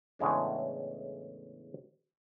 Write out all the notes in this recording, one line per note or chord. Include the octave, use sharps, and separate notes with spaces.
E2 A2 C#3 G#3 D4